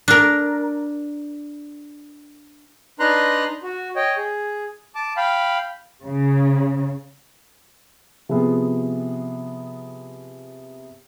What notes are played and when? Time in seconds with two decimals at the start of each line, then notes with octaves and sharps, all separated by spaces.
0.08 D4 A#4
3.00 D4 D#4 B4 A#5 C6 F#6
3.63 F#4
3.96 C#5 D#5 G5
4.17 G#4
4.95 A5 D6
5.17 F5 G5 B5
6.03 C#3
8.29 C3 F3 B3 G#4